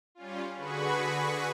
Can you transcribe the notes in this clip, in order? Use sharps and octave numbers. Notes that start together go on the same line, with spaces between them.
G3 C#4 F4
D3 F#4 G#4 B4 B5 C#6